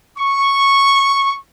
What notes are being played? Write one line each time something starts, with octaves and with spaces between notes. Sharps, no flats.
C#6